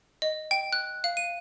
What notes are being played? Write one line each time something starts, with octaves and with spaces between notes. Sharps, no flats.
D#5
G5
F#6
F5
D#7